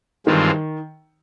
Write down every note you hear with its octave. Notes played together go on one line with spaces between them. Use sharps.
G2 D#3 E3 G#3 C4 F4